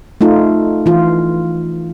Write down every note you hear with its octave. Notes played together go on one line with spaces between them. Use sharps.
A3 D#4 F4
E3 F4